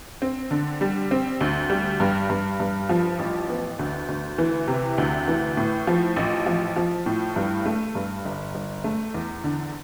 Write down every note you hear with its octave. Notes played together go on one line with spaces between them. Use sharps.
C4
D3
G3
C4
D2
G3
G2
G2
G2
F3
A1
B3
D2
D2
E3
C3
D2
E3
A2
F3
A1
F3
F3
A2
G2
A3
G2
G1
G1
A3
E2
D3